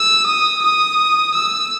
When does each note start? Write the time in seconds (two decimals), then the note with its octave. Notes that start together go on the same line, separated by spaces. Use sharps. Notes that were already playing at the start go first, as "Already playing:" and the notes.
Already playing: E6
0.27 D#6
0.63 D#6
1.34 E6